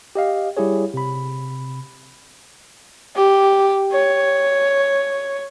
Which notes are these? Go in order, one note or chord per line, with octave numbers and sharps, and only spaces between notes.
G4 D#5 F5
G3 E4 G4 G#4 C#5
C3 B5
G4
C#5